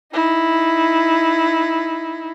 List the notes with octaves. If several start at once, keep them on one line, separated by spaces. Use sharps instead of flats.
D#4 E4